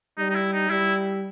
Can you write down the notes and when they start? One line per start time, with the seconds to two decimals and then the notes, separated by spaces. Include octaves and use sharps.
0.18 G3 D#4
0.30 D#4
0.35 E4
0.53 D#4
0.70 G3 E4